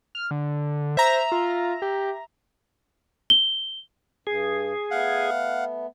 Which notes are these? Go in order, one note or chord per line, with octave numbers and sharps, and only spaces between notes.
F6
D3
C5 E5 A#5
F4
G4
G7
G2 G#4
A3 B3 F5 F#5